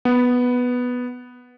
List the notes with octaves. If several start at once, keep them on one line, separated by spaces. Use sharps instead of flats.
B3